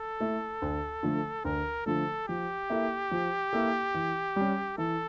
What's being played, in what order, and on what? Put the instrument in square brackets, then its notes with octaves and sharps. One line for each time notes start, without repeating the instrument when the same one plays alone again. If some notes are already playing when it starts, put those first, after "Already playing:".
Already playing: [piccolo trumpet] A4
[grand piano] A3 E4
D2
D3 F3 A3
[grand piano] D2 [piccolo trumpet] A#4
[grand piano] D3 F3 A3 [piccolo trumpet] A4
[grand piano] F3 [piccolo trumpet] G4
[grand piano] A#3 E4 A4 E5
F3
A#3 E4 A4 E5
E3
G3 C#4
[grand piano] E3 [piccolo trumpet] A4